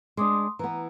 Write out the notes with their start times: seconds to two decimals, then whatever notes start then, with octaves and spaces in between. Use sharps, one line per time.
0.17 G#3 D4 C6 D6 D#6
0.59 E3 B3 A#5